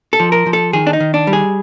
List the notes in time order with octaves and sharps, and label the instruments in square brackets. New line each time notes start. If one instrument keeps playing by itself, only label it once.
[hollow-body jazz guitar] A4
F3
A#4
F3
A4
D#3 G#4
D4
D#4
D#3
D4
G3
G#4